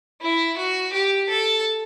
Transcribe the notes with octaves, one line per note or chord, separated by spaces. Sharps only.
E4
F#4
G4
A4